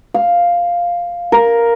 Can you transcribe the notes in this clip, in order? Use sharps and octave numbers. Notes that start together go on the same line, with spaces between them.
F5
A#4